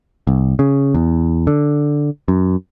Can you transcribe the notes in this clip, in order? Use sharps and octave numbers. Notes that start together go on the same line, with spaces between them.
C2
C#3
E2
D3
F#2